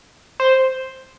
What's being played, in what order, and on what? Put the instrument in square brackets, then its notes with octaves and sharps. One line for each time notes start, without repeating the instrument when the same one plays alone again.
[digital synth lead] C5